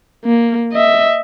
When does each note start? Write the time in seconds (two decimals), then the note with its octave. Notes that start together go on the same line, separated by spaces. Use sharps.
0.25 A#3
0.72 D#5 E5